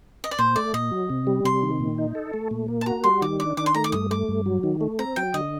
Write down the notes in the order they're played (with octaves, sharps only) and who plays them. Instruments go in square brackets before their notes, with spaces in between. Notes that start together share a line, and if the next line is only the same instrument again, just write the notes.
[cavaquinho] D#5
D5
[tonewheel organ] A#2 [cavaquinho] C5
[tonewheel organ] A3 [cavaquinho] D5
[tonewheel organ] A#2 [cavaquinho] D#5
[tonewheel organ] F#3
C3
G3
[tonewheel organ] C3 [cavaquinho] C6
[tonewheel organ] D#3
A#2
D#4
A4
A3
A#2
A#3
[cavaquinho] A5
[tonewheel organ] F#4 [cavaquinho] A#5
[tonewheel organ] G3 [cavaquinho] C6
[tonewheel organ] D#3 [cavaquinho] D6
[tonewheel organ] D4 [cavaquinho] D6
[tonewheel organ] D#3 [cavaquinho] D6
[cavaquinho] C6
[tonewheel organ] A3 [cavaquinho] A#5
[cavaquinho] D6
[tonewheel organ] G2 [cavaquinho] D#6
[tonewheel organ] A3 [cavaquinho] D6
[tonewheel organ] G2
F#3
D#3
A3
[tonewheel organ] C4 [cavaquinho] A#5
[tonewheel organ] F#3 [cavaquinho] G5
[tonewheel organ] D3 [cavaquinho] D#5